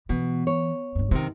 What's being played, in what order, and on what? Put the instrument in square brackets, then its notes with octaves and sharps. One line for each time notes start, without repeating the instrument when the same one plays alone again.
[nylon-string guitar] B2 [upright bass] D3 E3
[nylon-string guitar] C#5
[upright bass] G1 G2
[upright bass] F#2 C4 [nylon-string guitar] C3 D#3